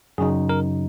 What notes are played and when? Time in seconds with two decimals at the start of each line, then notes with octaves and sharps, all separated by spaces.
0.18 F#2 C#3 F#3 D#4 G#4
0.49 A#4